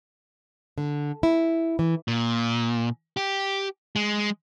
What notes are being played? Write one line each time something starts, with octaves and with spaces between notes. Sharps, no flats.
D3
E4
E3
A#2
G4
G#3